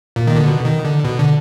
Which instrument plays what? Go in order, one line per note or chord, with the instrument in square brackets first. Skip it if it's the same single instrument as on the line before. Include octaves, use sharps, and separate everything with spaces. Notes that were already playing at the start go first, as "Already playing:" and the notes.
[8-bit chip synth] A#2
D#3
D3
B2
D#3
D3
B2
D3